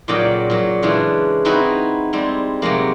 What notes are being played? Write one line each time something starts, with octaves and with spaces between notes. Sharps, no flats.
A#2 C#3 F#3 D5 D#5 G5
A#2 F#3
C#3 E3 G#3 D4
C4 D#4 E4 F#4 B4 G5
G3 G#3 C4
C3 F#3 G#3 A#3